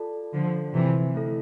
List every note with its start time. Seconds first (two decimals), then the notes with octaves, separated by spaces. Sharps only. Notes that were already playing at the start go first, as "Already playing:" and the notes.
Already playing: F4 A4 D5 A5
0.33 D3 F3
0.74 C3 E3
1.14 A3 E4 A4